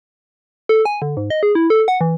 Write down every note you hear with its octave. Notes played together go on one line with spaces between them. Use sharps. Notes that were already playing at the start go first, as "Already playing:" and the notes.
A4
G#5
D3
G#2
D#5
G#4
E4
A4
F#5
E3